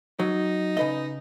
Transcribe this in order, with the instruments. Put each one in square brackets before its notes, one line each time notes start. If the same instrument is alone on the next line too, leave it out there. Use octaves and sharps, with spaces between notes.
[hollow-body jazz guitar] F#3 [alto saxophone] D#4
[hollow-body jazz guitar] C#3 B4 D#5